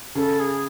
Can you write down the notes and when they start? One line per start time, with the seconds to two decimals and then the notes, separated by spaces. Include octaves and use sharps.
0.15 C#3 A4
0.40 G#4